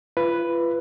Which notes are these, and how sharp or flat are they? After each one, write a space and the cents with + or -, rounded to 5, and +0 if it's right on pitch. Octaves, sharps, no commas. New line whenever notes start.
F4 -35 B4 +0